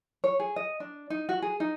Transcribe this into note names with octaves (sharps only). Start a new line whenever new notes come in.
C#5
G#4
D#5
D4
D#4
F#4
G#4
D#4